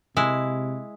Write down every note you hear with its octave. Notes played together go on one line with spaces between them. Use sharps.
C3 G#3 E4